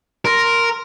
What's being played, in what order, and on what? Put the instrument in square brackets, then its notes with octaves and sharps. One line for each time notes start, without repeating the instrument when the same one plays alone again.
[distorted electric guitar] A#4 [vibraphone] C6